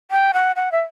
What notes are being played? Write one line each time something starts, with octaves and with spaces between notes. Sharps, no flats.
G5
F#5
F#5
E5